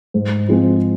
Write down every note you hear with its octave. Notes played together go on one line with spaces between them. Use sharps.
G#2
F3 G#3 C4